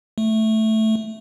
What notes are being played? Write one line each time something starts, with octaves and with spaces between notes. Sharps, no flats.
A3